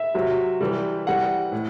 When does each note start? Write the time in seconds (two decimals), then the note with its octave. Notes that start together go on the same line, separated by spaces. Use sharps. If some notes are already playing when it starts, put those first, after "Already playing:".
Already playing: E5
0.14 C3 F#3
0.61 C3 E3 G3
1.06 C3 E3 G3 F#5
1.52 A2